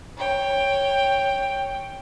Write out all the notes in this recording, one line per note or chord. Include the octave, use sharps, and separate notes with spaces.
C#5 G5